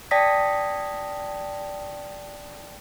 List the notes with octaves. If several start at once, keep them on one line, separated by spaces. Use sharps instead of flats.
D5 G5 A5 D#6 A#6 B6